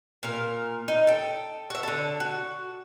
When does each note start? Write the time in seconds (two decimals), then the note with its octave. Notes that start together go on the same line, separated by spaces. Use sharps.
0.23 A#2 A#4
0.88 D#4
1.07 A4 G5
1.70 F#4 E5
1.83 D3 A4
2.20 F#4